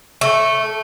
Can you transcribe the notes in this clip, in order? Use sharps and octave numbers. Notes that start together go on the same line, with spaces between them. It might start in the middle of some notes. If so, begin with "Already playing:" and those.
A3